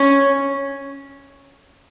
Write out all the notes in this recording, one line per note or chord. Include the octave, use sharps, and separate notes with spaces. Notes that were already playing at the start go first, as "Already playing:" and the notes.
Already playing: C#4